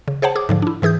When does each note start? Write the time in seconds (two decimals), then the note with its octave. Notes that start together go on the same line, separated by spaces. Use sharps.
0.08 C#3
0.22 G#4 C5 C#5 F#5 A5
0.36 G#4 D6 D#6
0.49 G#2 D3 F3
0.62 D4 E4
0.82 G#2 E3 G#4 D#6 G6